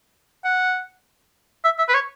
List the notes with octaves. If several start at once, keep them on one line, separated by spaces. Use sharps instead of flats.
F#5
E5
E5
B4
C#5